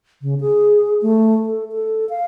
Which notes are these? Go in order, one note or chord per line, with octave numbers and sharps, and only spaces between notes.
C#3
G#4
A3
A4
A4
F5